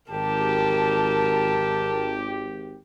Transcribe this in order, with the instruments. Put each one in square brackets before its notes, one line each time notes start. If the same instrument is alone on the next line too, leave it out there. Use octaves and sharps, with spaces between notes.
[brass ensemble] G#1 G4 [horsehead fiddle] A#4 A5